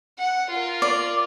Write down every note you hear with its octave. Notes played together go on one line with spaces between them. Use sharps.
F#5
F4 A#4
D5